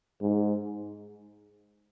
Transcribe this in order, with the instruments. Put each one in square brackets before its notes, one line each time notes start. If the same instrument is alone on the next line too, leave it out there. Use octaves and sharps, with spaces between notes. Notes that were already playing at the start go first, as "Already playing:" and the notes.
[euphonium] G#2